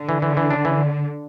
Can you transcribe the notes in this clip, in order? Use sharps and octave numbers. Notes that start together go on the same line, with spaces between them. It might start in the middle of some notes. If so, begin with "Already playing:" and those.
Already playing: D3
E3
E3
E3
D4
E3